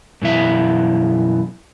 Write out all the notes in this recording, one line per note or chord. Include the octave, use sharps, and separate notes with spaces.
F#2 B2 E3 E5